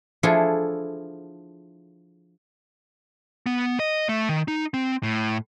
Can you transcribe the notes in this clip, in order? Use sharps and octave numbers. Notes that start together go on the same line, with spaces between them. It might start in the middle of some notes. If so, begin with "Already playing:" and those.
F3 D4 E4 F4 G#4 A4
B3
D#5
A3
D#3
D#4
C4
A2